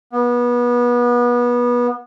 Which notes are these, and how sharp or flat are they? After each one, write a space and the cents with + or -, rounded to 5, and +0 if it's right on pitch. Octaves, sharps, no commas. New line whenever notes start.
B3 -25